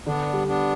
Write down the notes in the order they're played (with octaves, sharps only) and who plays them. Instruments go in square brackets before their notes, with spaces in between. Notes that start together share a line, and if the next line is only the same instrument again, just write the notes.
[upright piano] D3 [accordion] B3 D4
[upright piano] G3
[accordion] B3 D4